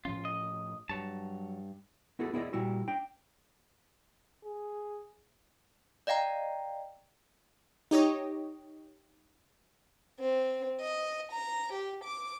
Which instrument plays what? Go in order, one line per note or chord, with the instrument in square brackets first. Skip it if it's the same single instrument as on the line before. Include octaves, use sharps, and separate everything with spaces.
[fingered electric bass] A2 F3 C#4 [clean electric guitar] F4
[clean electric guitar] D#5
[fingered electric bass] G2 [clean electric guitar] F#3 C#5 A5
[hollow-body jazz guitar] B3 E4 F#4 G#4 A4
B3 E4 G#4 B4 D5 D#5
A#2 G3 E4 F#4
D4 G5
[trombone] G#4
[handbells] D5 D#5 F5 G5 A#5
[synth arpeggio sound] D#4 G4 C#5 D#5
[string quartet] C4
D#5
A#5
G4
D6